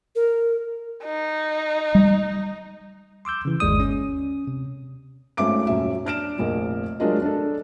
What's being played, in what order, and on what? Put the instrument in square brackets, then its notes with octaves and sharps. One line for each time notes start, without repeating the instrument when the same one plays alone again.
[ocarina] A#4
[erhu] D#4
[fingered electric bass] G3
[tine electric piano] C6 D6 E6 G6
C#3 E3
G1 D#2 G#3 D5 D#6
C#4
C3
[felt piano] G#1 A3 C#4 E5 D6 D7
D#1 F#2 E5
D4 F6 D7 E7
F1 A#1 A#4 D#5
F#3 G#3 D4 F4 A#4 D#5
D4 A4